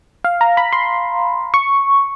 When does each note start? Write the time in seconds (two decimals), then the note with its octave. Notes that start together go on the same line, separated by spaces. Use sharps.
0.24 F5
0.41 A#5
0.57 B5
0.73 C6
1.54 C#6